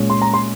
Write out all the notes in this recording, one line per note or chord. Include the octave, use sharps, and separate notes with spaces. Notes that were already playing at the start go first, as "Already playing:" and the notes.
Already playing: A#2 G#3 C#4
C6
A#5
C6